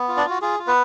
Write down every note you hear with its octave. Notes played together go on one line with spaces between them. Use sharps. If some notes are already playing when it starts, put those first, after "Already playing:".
Already playing: B3
F4
D4 D5
F4 F#4
F4 G#4
F4
B3 B4